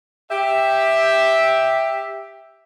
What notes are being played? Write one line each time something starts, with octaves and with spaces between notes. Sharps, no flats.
G4 E5